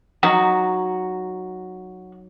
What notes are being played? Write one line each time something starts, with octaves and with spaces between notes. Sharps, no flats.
F#3 D#4 F#4